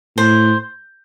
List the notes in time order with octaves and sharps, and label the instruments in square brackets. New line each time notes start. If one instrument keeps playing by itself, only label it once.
[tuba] A2 [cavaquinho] C5